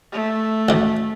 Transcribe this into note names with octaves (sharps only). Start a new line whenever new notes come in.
A3
A1 D2